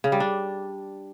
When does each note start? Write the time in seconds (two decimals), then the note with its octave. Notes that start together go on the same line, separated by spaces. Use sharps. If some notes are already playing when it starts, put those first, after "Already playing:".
0.04 C#3
0.12 G3
0.20 D4